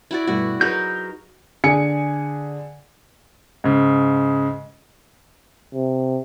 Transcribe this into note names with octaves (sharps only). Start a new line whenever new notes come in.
E4 F#4 D5
G2 B2 A3 F#4
F#3 D#4 G#4 A#4 B4 G6
D3 G#4 G#5 C#7
G#2 C#3
C3